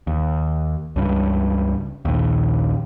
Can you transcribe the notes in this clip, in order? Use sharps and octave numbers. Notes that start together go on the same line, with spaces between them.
D#2
C#2 G2
A#1 D#2